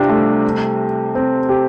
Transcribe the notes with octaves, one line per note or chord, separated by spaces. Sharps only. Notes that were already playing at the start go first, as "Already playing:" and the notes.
Already playing: C2 C3 D4 F4 G4
A3
C4
G4